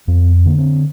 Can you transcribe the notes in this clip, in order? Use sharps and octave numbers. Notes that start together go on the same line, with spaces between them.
F2 C4
D3 A#3
C4